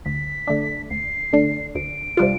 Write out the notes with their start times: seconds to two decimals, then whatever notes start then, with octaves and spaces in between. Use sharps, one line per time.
0.05 D2 B6
0.47 D3 A3 D4
0.90 D2 C7
1.33 D3 A3 D4
1.75 D2 D7
2.17 C3 G3 D4 F4